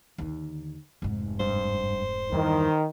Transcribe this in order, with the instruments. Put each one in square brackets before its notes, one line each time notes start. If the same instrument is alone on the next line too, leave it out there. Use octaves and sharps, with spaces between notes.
[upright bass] D#2 D3
F1 G#2
[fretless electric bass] G2 [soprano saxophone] C5
[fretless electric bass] E2 G2 E3 [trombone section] D#3